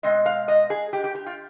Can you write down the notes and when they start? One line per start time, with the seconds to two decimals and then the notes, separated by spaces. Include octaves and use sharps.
0.03 B2 G#3 C4 D#5
0.26 F5
0.48 D#5
0.70 G#4
0.93 G4
1.04 G4
1.15 G4
1.26 F4